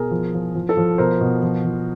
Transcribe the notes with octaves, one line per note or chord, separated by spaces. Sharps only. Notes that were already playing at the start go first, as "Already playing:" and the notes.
Already playing: B2 G#4 A#4
F3
F3
F3
A4
F3
B2 A#4 C5
B2
F3
F3